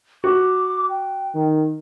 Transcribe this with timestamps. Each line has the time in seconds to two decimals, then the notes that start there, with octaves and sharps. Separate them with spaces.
0.24 F#4 D6
0.89 G5
1.35 D#3